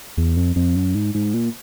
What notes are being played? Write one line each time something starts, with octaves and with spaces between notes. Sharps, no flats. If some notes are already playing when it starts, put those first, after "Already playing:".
E2
F2
F2
F#2
G#2
G#2
A#2